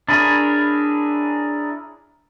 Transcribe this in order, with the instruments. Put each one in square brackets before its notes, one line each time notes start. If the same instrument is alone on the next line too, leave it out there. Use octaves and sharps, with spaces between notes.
[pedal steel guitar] D4 E4 G#4 A#4 C#5